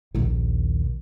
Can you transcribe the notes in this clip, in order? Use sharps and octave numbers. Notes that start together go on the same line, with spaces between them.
A#1 D#2